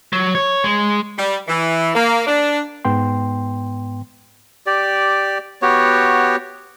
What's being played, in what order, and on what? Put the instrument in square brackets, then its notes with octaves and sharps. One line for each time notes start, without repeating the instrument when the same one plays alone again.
[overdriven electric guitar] F#3
C#5
G#3
[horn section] G3
E3
A#3
D4
[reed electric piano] G#2 B3 G5 C6
[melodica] G4 D5
B3 F#4 G4 C#5